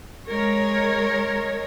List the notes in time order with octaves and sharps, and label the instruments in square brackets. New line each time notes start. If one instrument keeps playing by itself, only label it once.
[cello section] G#3 A#4 C#5